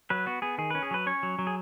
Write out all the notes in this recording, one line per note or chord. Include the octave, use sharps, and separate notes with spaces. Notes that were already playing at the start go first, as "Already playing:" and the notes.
F#3 B4
B3 F#4
B3 G#4
D#3 G#4
C#4 B4
G#4
F#3 B4
C#4 C#5
F#3
F#3
G#4